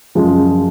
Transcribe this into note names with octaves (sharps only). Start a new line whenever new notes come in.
F#2 C#3 F3 G#3